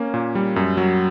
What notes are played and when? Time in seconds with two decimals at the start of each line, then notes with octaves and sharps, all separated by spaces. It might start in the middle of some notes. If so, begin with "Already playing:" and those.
Already playing: A#3 C#4
0.14 A#2
0.35 G3
0.56 F#2
0.77 F#3